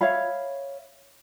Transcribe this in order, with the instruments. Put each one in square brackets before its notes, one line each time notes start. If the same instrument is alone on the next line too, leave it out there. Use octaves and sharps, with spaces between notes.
[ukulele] C#5 E5 F5 B5